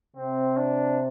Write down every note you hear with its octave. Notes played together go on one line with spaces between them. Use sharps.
C3 C4
D4